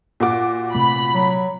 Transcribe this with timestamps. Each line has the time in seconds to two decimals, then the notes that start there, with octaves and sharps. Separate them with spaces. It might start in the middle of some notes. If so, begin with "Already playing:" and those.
0.20 A#2 F#4 D6
0.75 C3 A3 B5
1.14 F#3